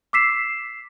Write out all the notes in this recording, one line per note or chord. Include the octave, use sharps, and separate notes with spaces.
D6 E6 B6 C7 E7